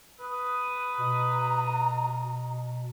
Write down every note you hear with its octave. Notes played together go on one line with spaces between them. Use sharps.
B4 D#6
B2 A#5